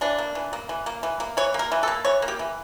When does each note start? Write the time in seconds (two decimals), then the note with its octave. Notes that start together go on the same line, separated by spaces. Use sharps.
0.01 E3 D4
0.18 A#3
0.35 E3
0.53 A#3
0.69 E3
0.86 A#3
1.03 E3
1.20 A#3
1.37 E3 C#5
1.54 A#3
1.59 A#4
1.72 E3
1.83 A4
1.88 A#3
2.05 E3 C#5
2.22 A#3
2.28 G4
2.39 E3